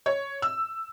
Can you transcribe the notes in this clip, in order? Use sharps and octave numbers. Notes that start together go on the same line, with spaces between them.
C#5
E6